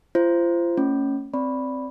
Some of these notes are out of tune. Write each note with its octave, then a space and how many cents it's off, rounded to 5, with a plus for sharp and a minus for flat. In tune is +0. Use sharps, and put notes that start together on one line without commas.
F4 -35 C5 -5
A3 +45 C#4 -5
C4 +0 D5 -15 B5 -5